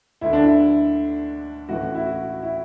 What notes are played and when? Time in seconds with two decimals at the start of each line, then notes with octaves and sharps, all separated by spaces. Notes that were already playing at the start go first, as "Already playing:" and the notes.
0.21 D2 D3 E4
0.33 D4
0.44 E4
1.69 A1 A2 E3 F#4
1.95 E4
2.06 F#4
2.43 E4